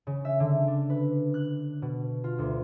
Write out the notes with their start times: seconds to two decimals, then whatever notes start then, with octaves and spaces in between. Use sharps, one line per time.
0.07 C#3
0.25 E5
0.40 D3
0.67 D4
0.90 B4
1.34 F#6
1.82 B2
2.24 F4
2.39 D2